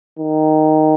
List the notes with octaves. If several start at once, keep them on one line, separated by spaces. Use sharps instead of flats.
D#3